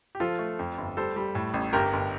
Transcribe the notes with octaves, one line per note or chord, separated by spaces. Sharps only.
G4
F3 F4 A4
A3
F2
G1
G3 A4 C5
G3
A2
A1
G1 G4 A#4
G1